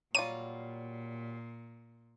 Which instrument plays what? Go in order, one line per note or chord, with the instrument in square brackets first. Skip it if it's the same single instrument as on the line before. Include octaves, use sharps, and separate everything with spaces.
[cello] A#2 [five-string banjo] F#3 G3 F4 [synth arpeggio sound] D#7